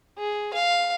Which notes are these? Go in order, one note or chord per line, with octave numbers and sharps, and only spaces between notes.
G#4
F5